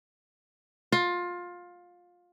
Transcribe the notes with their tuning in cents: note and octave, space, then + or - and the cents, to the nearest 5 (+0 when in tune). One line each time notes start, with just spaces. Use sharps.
F4 +20